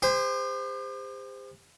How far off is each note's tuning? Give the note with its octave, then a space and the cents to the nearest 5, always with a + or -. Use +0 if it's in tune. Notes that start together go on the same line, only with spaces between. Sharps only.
G4 +45 C5 -15